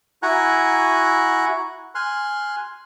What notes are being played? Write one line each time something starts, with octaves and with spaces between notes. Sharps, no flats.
E4 F#4 F#5 G#5 A#5 F#6
G#5 C6 F6 F#6